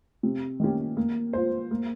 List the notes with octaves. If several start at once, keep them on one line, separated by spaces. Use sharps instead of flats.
C3
D#3 A#3 C#4 G4
A#3
F4 C5
A#3